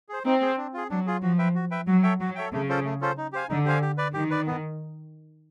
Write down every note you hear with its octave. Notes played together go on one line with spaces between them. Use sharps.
G#4 C5
C4 D#4
G#4 C5
D4
F4 G#4
F#3 D4
F4 G#4
F3 F#4
B4 E5 G5
F#4
B4 E5 G5
F#3 F#4
A4 C#5 E5 G5
F#3 F#4
A4 C#5 E5 G5
C#3 A3
C#4 F4 A4 C5
A3
C#4 F4 A4 C5
D#4
G4 C5 F5 G#5
D3 D#4
G4 C5 F5 G#5
G4
B4 D5
D#3 G4
B4 D5
B3